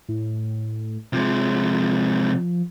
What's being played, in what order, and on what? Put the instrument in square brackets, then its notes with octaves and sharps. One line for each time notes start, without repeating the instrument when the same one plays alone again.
[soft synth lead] A2
[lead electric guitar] C3 G#3 [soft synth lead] F3